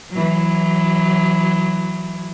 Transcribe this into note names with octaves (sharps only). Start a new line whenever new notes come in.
E3 F#3